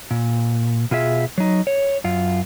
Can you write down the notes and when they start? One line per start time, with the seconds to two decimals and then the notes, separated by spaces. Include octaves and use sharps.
0.11 A#2
0.91 B2 F4 G#4 E5
1.38 F#3 D#4
1.67 C#5
2.04 F#2 F4